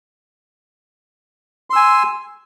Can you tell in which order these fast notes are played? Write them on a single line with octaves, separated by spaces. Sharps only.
C6 E6 G#5